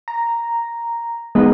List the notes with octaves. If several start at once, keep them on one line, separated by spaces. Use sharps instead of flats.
A#5
G#3 B3 D#4